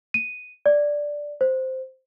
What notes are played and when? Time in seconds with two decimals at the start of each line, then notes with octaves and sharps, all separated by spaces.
0.14 D#7
0.66 D5
1.41 C5